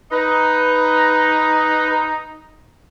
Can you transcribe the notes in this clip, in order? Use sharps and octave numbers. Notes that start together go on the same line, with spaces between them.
D#4 B4